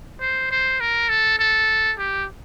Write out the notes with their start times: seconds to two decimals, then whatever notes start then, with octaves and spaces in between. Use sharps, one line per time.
0.21 C5
0.51 C5
0.80 A#4
1.09 A4
1.39 A4
1.98 G4